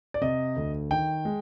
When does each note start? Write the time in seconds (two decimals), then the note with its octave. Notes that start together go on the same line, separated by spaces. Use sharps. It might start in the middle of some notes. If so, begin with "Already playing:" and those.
0.14 D5
0.21 C3 D#5
0.56 D2
0.91 D#3 G5
1.25 G#3